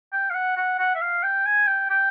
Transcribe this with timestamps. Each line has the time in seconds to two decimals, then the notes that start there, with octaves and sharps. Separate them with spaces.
0.13 G5
0.30 F5
0.35 F#5
0.57 F#5
0.79 F#5
0.95 E5
1.01 F5
1.23 G5
1.46 G#5
1.67 G5
1.90 G5